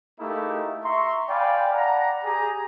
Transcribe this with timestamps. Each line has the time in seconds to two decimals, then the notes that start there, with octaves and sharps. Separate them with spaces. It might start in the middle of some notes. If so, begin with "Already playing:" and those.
0.20 A3 A#3 D#4 E4 G4 G#4
0.84 E5 A#5 C6 C#6
1.29 D5 F5 G5 G#5 B5
1.74 D5 F#5 A5 A#5
2.24 G4 G#4 A#5